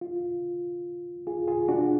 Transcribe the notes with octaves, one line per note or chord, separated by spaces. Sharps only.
F4
F4 G#4
F4 G#4
D4 F#4